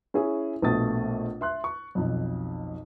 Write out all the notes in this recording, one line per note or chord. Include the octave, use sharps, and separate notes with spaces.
C#4 E4 G#4
A#1 B2 A3 D#6 A6
E5 C6 F#6
C#6
B1 F2